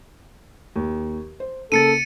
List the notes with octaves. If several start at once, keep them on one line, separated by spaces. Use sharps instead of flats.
D#2
C5
C#3 A#3 A4 A6 C#7 D#7